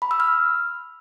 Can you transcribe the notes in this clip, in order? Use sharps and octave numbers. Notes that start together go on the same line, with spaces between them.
B5
E6
F6